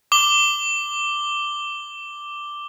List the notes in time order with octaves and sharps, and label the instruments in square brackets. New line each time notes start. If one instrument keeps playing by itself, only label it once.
[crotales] D6 G7